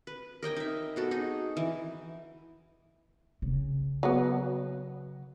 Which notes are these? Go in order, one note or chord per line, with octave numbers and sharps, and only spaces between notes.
B4
A#4 D#5 G5 G#5
D#4 E5
B3 F#4 A4
D#4 G#4
E3
C#3
F#3 B3